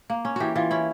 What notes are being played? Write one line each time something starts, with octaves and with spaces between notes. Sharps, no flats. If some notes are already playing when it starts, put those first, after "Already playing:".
A#3
C#4
E3 F#4 G4
E3 F4
C#4 E4